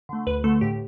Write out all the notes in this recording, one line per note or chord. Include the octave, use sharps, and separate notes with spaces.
D3 A3
D2 B4
D3 A3 A4
A2 G4